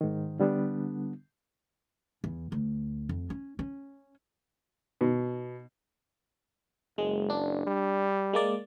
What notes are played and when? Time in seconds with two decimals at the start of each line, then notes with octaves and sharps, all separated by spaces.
0.01 G#2 D#3
0.39 D3 G3 B3 D4
2.24 E2
2.52 D2
3.09 F2
3.30 C#4
3.59 C#4
5.01 B2
6.98 F#1 G#3
7.30 D4
7.67 G3
8.33 G#3 A#3 D5